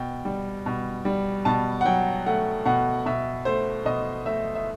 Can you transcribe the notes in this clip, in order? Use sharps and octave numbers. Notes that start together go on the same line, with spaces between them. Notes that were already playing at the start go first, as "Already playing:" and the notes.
Already playing: B2 G5
G3
B2
G3
B2 A5
F#5
F#3 G5
A3 F#5
B2 F#5
B2 E5
A3 C5
B2 D#5
A3 E5
E5